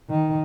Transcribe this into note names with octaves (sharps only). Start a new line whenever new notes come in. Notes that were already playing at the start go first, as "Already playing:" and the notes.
D#3